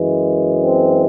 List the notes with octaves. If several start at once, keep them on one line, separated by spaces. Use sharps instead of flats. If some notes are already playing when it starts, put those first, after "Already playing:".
Already playing: F#2 E3 G#3
C4